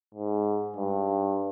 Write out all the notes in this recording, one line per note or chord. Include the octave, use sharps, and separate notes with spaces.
G#2
G2